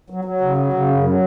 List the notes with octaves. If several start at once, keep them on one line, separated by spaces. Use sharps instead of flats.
F#3
F#3
C#3
F#3
C#3
F#2
F#3